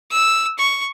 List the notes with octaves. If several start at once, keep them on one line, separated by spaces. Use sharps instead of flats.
E6
C#6